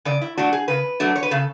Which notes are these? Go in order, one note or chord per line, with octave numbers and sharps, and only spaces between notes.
C#3 D5
E4
F#3 A3 D4 F#4
G#4
C#3 B4
F#3 A3 D4
C#5
B4
C#3 A4